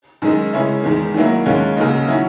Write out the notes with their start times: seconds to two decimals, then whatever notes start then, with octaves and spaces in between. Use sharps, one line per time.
0.22 F#2 D#3 G#3 D#4
0.53 C#3 G#3 C#4 E4
0.84 E2 D#3 G#3
1.14 D#3 F#3 A#3 E4
1.46 D#2 D#3 G#3 C#4
1.77 F#2 C#3 F#3 A#3 D#4
2.08 D#3 F#3 C#4 E4